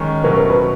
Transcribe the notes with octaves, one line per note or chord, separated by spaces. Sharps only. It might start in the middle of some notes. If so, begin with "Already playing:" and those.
Already playing: D#3 G#3 C#4
B2 F#3 A3 C#4 A#4
A#4
B4